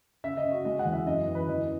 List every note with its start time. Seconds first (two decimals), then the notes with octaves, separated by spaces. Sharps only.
0.24 C#3 E5
0.37 D#5
0.44 C#3
0.51 F#4
0.65 G#3 D#5
0.79 F#5
0.85 E2
0.93 E5
1.07 F#2 D#5
1.28 E3
1.35 B4
1.48 E2 D#5